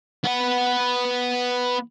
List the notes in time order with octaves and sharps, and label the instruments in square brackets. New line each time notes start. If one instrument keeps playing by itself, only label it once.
[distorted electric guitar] B3 F#5